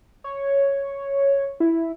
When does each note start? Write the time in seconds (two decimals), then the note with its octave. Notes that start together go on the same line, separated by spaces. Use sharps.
0.24 C#5
1.60 E4